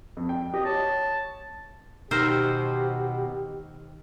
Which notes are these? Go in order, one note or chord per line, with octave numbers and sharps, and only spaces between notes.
F2
G5
G4 D#5
C#5 A5
B2 D#3 G4 C5 E6 F6 A#6